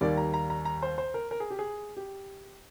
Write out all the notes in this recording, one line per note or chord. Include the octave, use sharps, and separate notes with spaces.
D#2 D#3 G3 A#3 D5
A#5
A#5
A#5
A#5
C5
C5
A#4
A#4
G#4
G4
G#4
G4